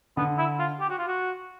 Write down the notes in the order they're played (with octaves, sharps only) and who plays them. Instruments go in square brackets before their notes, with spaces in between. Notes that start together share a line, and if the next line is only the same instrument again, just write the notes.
[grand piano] D3 [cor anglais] B3
[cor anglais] E4
F4
G4
F#4
F4
F#4